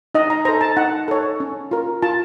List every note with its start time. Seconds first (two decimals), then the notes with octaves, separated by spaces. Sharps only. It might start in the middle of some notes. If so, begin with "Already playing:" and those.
0.15 D#4 D#5
0.30 A#5
0.45 A4 C5 A#5
0.61 A5
0.76 D#4 F#5
1.08 A4 C#5
1.40 C#4
1.71 F4 A#4
2.02 F4 A5